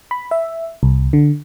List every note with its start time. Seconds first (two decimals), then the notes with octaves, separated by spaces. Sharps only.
0.11 B5
0.31 E5
0.83 C2
1.13 D3